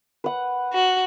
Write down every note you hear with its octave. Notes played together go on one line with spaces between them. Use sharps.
B4 F#5
F#4